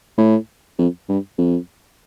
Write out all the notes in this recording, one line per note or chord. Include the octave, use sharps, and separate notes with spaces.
A2
F2
G2
F2